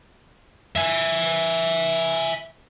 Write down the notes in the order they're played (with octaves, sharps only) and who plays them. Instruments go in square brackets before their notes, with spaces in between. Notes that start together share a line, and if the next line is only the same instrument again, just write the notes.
[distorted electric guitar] E5 G#5